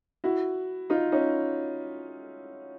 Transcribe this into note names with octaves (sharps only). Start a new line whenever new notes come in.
E4 F#4
D#4 F4
C#4 D#4